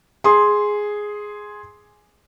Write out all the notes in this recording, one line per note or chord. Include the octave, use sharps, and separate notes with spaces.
G#4 C6